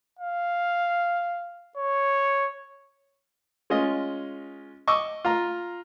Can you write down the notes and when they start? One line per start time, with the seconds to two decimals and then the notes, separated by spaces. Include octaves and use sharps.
0.19 F5
1.77 C#5
3.70 G#3 C#4 F4 D#5
4.87 D#5 C#6 D6 E6
5.25 F4 A#5